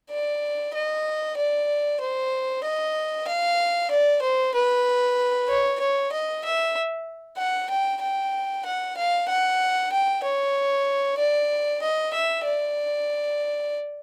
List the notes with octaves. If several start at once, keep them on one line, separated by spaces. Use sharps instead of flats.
D5
D#5
D5
C5
D#5
F5
D5
C5
B4
C#5
C#5
D#5
E5
F#5
G5
G5
F#5
F5
F#5
G5
C#5
D5
D#5
E5
D5